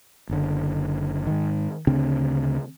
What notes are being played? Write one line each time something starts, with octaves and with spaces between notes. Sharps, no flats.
F#1 D3
G#2 D#3
D2 C#3 C4 D4